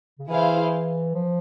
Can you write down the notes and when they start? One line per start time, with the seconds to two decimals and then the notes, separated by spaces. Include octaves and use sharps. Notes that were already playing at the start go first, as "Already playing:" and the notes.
0.19 C#3
0.28 E3 E4 G#4 C5 F5
1.15 F3